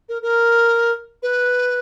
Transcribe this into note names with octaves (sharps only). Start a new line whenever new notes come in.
A#4
A#4
B4